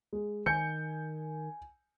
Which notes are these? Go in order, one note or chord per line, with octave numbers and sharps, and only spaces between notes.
G#3
D#3 G#5 G6 C#7